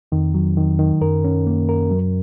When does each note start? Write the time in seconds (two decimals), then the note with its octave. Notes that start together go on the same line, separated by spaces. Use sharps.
0.12 F2 D#3
0.34 F#3
0.57 D#3
0.79 D#3
1.01 F#2 A#4
1.24 C#4
1.47 A#3
1.69 A#4
1.90 F#3